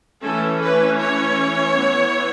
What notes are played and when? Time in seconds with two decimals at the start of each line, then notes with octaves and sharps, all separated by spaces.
0.24 E3 A3 C#4 A4
0.62 B4
1.00 C#5
1.77 E3 B3